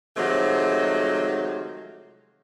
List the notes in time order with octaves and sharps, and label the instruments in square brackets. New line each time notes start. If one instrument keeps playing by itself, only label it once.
[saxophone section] C3 D#3 F3 F#3 G#3 A3